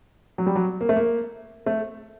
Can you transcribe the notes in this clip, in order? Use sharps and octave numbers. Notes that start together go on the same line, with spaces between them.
F#3
G3
F#3
A#3
A3
A#3
A3